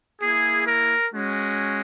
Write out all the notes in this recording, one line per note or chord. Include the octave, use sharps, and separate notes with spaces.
A#3 E4 G#4
A#4
G#3 C#4 F#4